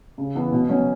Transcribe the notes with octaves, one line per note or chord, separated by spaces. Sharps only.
C#3
E3 B3 E4
B2
F#3 C#4